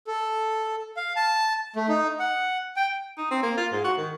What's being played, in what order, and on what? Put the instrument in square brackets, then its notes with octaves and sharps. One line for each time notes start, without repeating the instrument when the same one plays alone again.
[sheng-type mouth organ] A4
F5
A5
A3
D#4
F#5
G5
[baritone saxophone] D#4
C4
A#3
F4
G#2
F#4
D#3